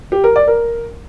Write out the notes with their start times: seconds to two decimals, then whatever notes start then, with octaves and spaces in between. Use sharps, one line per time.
0.12 G4
0.24 A#4
0.36 D5
0.48 A#4